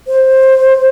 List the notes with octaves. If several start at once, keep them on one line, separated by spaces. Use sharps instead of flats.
C5